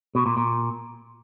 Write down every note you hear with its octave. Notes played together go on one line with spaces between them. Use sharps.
B2
A#2
A#2